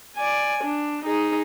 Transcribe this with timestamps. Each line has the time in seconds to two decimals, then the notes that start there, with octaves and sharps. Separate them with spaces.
0.16 D5 G#5
0.64 D4
1.05 D#4 G#4